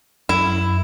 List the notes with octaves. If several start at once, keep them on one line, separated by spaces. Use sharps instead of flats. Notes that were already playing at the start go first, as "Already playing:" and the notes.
F#2 E4